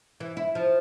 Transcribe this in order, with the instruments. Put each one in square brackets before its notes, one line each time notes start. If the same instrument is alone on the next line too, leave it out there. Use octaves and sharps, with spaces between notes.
[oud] E3
E4
F3